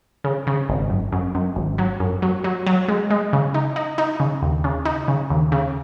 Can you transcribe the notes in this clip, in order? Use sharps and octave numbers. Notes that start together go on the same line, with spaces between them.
C#3
C#3
G#1
F#2
F#2
F#2
G#1
F#3
F#2
F#3
F#3
F#3
G#3
G#3
C#3
D#4
D#4
D#4
C#3
D#2
C#3
D#4
C#3
D#2
C#3